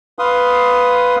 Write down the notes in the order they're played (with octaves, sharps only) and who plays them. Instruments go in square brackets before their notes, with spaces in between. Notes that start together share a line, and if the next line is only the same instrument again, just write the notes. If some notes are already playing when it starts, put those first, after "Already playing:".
[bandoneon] B4 F5 C6 D#6